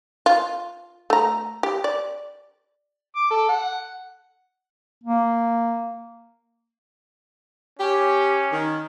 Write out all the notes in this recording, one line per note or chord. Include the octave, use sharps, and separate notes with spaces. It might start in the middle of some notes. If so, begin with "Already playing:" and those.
F4
A3 A#5
G4
D5
D6
A4
F#5
A#3
C#4 G4
D#3